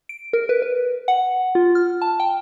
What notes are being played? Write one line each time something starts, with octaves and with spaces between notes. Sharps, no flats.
D7
A#4
B4
B4
F#5
F4
F6
A5
G5